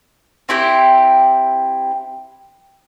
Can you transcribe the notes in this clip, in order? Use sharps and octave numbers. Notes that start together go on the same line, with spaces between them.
C4 E4 G4